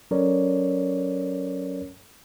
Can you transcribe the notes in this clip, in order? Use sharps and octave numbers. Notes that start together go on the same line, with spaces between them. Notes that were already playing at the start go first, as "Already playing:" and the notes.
F#3 C#4 A4 A#4 C#5 D5